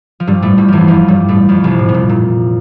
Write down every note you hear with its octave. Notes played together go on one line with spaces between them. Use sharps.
F3
G2 G3
A2 A3
G2 G3
E2 E3 F3
F2 F3
G2 G3
A2 A3
F2 F3
C2 C3
A2
C3
A#2
A#2